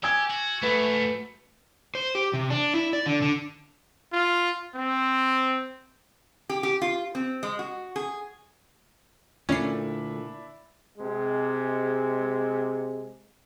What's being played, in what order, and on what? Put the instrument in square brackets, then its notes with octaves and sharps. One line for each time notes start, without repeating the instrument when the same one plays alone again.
[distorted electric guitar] G4 [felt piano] G#5 E6 G#6
[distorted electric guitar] F#4
[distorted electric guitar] G#2 F3 [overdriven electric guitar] A3 [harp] F#4 B4
[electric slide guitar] C5
G4
C3
D4
E4
D5
D3
D3
[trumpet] F4
C4
[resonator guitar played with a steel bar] G4
G4
F4
C4
G#3
F#4
G#4
[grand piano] A#2 [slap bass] D3 A3 [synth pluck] C#4 C7 [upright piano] D4 E4
[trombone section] C3 G#3